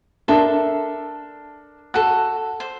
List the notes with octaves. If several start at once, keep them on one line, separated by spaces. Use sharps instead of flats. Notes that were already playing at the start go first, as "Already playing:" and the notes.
D4 A4 A#4 E5 C6
F#4 A4 F#6
C5